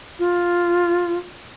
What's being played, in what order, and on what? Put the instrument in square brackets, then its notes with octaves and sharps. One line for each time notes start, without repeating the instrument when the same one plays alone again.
[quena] F4